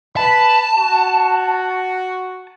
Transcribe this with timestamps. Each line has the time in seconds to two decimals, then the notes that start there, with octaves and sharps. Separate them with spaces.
0.17 B4 A5 B5
0.78 F#4